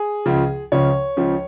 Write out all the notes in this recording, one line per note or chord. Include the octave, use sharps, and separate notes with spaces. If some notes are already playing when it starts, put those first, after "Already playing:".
Already playing: G#4
C#2 C#3 F3
C#2 C#3 F3 C#5
C#2 C#3 F3